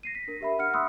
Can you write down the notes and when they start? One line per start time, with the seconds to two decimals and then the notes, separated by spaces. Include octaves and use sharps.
0.03 A#6 C7 D#7
0.15 B6
0.27 D4 A#4
0.41 G4 E5 B5
0.58 D4 F#5 F6 C#7
0.74 E5 B5 C6 D#6 E6 F#6